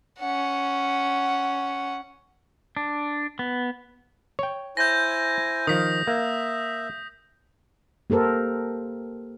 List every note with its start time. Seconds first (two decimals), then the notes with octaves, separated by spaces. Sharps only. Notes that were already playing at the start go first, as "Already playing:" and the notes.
0.19 C#4 F#5
2.77 D4
3.39 B3
4.39 C#5 G5
4.77 E4 C5 G#5 G6 A#6
5.67 D#3 F3 D#6 B6
6.07 A#3 E5
8.10 A#3 G4 A4 A#4 C5